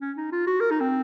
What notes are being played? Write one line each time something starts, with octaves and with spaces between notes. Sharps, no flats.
C#4
D#4
F4
F#4
A#4
D#4
C4